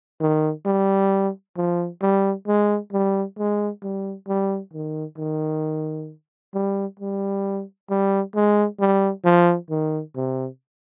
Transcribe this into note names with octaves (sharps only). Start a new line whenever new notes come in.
D#3
G3
F3
G3
G#3
G3
G#3
G3
G3
D#3
D#3
G3
G3
G3
G#3
G3
F3
D#3
C3